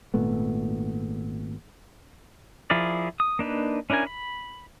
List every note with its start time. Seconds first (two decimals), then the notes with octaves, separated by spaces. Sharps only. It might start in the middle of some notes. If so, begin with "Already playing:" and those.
0.14 G#1 A#2 A3 B3
2.70 F3 E4 G#4 A#4 D5
3.20 D#6
3.39 A#3 D4 D#4 B4
3.90 C#4 D4 E4 A#4 G#5
4.07 B5